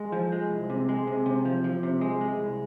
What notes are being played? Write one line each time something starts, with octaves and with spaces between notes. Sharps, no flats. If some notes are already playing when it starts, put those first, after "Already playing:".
Already playing: G#3
F3
G#3
C2
C3
G#3
C3
C3
F3
F3
C3
G#3
G#3
C2